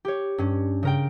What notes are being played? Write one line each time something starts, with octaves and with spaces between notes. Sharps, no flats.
G4 C#5
G2 C#4
C#3 A#4 G5